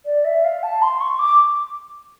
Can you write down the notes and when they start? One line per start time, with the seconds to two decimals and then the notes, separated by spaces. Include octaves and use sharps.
0.06 D5
0.25 E5
0.44 F5
0.63 A5
0.82 C6
1.00 C#6
1.19 D6